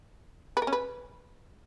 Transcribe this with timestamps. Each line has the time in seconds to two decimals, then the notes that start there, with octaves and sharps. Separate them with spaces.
0.57 B4
0.62 A#4
0.67 C#4
0.72 B4